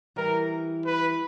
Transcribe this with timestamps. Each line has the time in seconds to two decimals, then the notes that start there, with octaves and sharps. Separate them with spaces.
0.16 E3 G3 A#4
0.86 B4